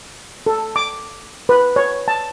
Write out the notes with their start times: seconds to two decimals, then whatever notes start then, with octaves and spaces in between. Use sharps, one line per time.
0.46 A4
0.76 D6
1.49 B4
1.76 C#5
2.08 A5